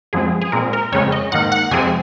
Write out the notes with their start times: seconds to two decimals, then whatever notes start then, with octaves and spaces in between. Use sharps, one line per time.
0.13 F#2 F3 G#3 C4 G#4
0.41 G#4
0.52 A#2 G#3 C4 A#4
0.73 A#4
0.92 F2 C#3 G#3 C4 C#5
1.12 D#5
1.32 G#2 D#3 A#3 F#5
1.52 F#5
1.71 F2 C3 F3 G#3 C4 G#5